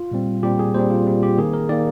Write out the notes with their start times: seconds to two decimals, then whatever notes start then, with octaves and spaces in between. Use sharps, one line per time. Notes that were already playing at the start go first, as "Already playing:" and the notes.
Already playing: F4
0.11 A#2 G3 C4
0.43 A#2 G3 C4 G4
0.59 G#4
0.74 A#2 G3 C4 C5
0.90 F4
1.07 A#2 G3 C4
1.23 G4
1.38 D#3 A#3 G#4
1.54 A#4
1.69 D#3 A#3 D5